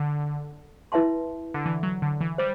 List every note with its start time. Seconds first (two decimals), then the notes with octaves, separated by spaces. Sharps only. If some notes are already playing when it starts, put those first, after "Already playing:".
Already playing: D3
0.92 E4 B4 E5 A5 C6
1.54 D3
1.66 E3
1.83 F#3
2.02 D3
2.21 E3
2.38 G3 C5